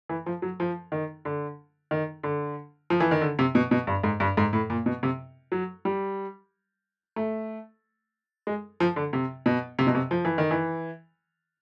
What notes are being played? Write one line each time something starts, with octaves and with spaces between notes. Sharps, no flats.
E3
F3
F#3
F3
D#3
D3
D#3
D3
F3
E3
D#3
D3
C3
B2
B2
G2
G#2
G2
G#2
A2
A#2
B2
C3
F#3
G3
A3
G#3
F3
D3
C3
B2
C3
B2
C3
F3
E3
D#3
E3